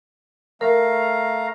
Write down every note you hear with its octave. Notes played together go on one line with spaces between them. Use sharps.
A3 A#4 F5 A#5